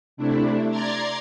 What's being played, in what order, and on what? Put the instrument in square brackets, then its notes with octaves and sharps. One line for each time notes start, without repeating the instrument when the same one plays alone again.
[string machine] C3 A3 D4 E4
D5 A#5 C6 G#6 A6 C7